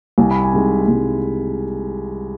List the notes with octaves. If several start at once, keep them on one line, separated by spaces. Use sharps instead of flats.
C2 G#5
B5
G#5
C3 D#3 G#3
C2